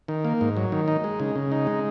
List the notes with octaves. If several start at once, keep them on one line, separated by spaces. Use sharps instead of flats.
D#3
A#3
G#2
F#3
D#3
D#4
G#3
C#3
C#3
D#4
G#3